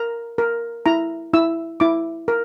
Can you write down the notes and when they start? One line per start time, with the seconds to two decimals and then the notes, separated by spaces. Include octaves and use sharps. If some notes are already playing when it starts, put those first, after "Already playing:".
Already playing: A#4 A#5
0.38 A#4
0.86 E4 A#5
1.33 E4 E6
1.80 E4 D6
2.28 A#4